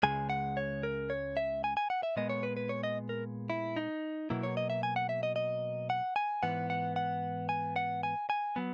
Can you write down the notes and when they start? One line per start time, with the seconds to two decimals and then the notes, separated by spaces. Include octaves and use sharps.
0.03 C#2 C#3 G#3 G#5
0.30 F#5
0.57 C#5
0.83 A#4
1.10 C#5
1.37 E5
1.64 G#5
1.77 G#5
1.90 F#5
2.03 E5
2.16 A#2 G#3 B3 D#5
2.30 C#5
2.43 B4
2.57 B4
2.69 C#5
2.83 D#5
3.09 A#4
3.50 E4
3.76 D#4
4.30 B2 F#3 A#3 E4
4.43 C#5
4.57 D#5
4.70 E5
4.83 G#5
4.96 F#5
5.09 E5
5.23 D#5
5.36 D#5
5.90 F#5
6.16 G#5
6.43 G#2 E3 B3 F#5
6.70 F#5
6.96 F#5
7.49 G#5
7.76 F#5
8.03 G#5
8.30 G#5
8.56 F#3 B3